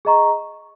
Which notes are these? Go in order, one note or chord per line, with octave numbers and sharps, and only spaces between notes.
G#4 D#5 A#5 C#6